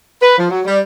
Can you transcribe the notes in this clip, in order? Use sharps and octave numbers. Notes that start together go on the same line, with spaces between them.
B4
F3
F#3
G3